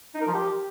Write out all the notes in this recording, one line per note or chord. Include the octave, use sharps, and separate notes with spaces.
D#4
A#4
F3
G4